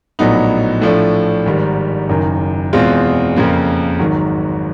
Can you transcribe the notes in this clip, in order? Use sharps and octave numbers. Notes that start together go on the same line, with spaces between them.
A#1 A2 F#3 B3 D#4
A2 F3 A3 D4
G#1 G#2 D#3 G3
F#1 F#2 D#3
E2 B2 G#3 C4 F4
F2 C#3 F3 A#3
G#1 G#2 D#3 F#3